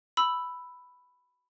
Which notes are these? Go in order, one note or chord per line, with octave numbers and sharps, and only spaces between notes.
B5 E6